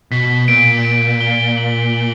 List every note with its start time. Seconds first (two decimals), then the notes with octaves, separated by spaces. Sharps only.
0.11 B2 B6
0.48 A#2 D7
0.85 D7
1.21 G7
1.57 F#7
1.93 F#7